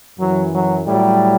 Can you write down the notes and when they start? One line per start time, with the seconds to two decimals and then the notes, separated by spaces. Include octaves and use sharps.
0.19 F#2 E3 F#3
0.52 F#3
0.85 A2 F#3 G3